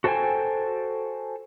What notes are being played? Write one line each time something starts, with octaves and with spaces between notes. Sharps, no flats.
F#4 A4 C5 D#5 G5 G#5